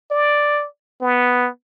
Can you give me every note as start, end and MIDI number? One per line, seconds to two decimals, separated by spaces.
0.11 0.67 74
1.01 1.49 59